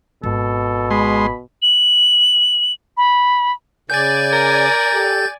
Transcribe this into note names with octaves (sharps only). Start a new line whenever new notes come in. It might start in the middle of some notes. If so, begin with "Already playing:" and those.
G#1 B2 A4
G#3 B5 C6
F#7
B5
C#3 D5 G#5 G6 A6
A#4
G4 A4